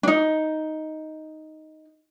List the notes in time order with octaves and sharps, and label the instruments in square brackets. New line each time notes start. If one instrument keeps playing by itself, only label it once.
[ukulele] D4 D#4